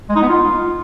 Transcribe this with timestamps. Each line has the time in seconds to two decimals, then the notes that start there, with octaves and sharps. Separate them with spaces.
0.09 G#3
0.16 D#4
0.22 B3
0.29 F4